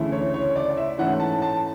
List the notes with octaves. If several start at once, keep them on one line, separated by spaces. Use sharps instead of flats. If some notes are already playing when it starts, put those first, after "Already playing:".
Already playing: D2 C#3 E3 A3
C#5
C#5
D5
E5
G#2 E3 A3 C#4 F#5
A5
A5